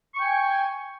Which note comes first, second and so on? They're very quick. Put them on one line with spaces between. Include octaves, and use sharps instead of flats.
C#6 G5 G#5